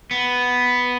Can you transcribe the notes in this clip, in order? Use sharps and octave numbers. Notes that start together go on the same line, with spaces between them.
B3